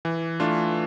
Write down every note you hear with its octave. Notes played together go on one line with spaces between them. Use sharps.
E3
A3 D4 F4